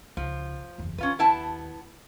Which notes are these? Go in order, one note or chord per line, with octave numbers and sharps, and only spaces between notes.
C#2 F3
F#1 E2
D#2 C#4 F4 B4
B3 E4 A5